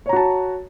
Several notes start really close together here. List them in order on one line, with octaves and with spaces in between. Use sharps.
C#5 A#5 F#4 A5